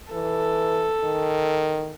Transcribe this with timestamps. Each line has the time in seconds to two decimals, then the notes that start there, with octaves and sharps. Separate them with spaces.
0.12 E3 A4
1.04 D#3